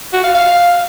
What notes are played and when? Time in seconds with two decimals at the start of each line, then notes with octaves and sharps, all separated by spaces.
0.13 F#4
0.24 F5
0.34 F5